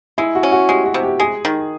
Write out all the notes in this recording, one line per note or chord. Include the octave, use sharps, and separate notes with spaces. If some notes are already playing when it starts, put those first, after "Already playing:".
G#3 E4
F#4
C#4
F#4
G#3 G4
F#4
C3
G4
G#3 G#4
D#3